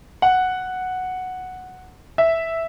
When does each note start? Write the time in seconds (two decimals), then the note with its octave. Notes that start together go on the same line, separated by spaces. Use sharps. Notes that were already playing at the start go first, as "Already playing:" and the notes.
0.22 F#5
2.18 E5